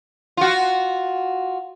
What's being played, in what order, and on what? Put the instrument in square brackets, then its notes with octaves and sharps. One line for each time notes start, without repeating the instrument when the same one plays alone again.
[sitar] F4 F#4